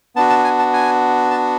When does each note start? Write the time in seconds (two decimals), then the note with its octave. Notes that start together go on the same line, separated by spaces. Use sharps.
0.16 B3 D4 F#4 A5
0.30 A5
0.44 G#5
0.59 A5
0.73 G#5
1.31 A5